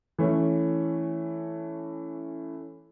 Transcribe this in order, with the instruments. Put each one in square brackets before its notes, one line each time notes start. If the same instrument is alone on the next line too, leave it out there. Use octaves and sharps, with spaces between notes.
[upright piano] E3 A3 C#4